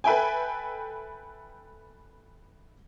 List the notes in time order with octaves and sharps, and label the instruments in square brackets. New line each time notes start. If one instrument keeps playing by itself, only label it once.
[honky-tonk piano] A4 B4 E5 G5 G#5